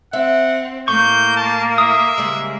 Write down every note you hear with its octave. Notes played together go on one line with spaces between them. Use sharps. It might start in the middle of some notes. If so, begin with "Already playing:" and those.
C4 E5 F#5
A2 A#3 C#6 G6
A5
E5 D#6
C#3 G3 G#3